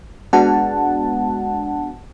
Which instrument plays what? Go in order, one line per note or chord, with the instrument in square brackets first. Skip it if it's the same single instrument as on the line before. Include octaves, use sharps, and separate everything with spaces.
[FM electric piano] G#3 B3 D4 F#4 F#5 A5